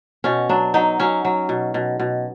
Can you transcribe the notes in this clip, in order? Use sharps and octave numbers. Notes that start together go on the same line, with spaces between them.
B2 C#4
F#3 D4
F#3 D#4
F#3 C#4
F#3
B2
B2
B2